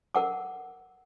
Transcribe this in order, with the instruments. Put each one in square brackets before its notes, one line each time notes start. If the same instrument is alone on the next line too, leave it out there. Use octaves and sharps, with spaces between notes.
[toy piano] A#4 F#5 D6